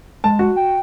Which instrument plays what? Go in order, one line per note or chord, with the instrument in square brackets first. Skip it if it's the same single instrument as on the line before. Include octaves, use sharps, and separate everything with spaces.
[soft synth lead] G#3 [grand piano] A5
[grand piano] F#4
[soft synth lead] G5